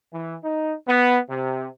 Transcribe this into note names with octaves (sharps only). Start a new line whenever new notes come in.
E3
D#4
B3
C3